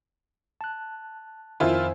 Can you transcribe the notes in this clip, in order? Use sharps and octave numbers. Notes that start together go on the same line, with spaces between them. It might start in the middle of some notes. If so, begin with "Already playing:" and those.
A5 F#6
F2 D#3 E4 F4 C5 G#5